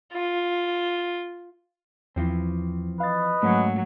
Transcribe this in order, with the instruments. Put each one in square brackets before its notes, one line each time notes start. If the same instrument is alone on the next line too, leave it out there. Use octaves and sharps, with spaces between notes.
[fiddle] F4
[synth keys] E2 [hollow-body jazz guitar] E3 F3 C4
[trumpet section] B4 D#5 [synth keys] F5 A6
[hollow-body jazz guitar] G#2 C#4 [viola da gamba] F#3 [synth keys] A3 A#3